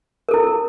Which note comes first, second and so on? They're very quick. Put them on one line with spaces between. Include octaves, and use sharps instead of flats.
A#4 A4 E4